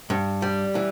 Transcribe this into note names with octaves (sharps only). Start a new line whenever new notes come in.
G2
G3
E3